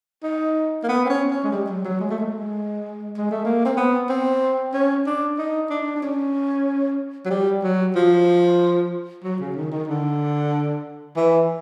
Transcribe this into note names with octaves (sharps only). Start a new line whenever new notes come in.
D#4
A#3
B3
C4
C#4
C#4
G#3
G3
F#3
F#3
G#3
A3
G#3
G#3
A3
A#3
C4
B3
C4
C#4
D4
D#4
D4
D4
C#4
F#3
G3
F#3
F3
F#3
C#3
D#3
D#3
D3
E3